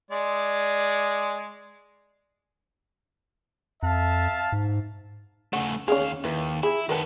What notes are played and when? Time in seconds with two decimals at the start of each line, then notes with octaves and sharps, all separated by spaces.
0.11 G#3 D5
3.83 F2 E5 F5 A5
4.52 G#2
5.53 C#3 A3 F#5
5.88 D#2 C#4 D#4 G#4 F5
6.24 D#2 E4 B4
6.63 E4 G#4
6.89 D#3 B3 A#4 B4 A5